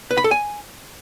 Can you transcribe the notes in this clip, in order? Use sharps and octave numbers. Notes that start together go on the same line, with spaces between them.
B4
B5
A4
G#5